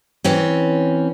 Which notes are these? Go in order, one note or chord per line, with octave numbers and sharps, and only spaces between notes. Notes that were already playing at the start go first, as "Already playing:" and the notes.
E3 C4 C#4